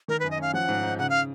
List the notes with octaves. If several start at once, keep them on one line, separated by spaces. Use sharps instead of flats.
D#3 A#4
F#2 B4
D#5
C#4 F5
F3 F#5
G#2
D#4
C#3 F#5
F5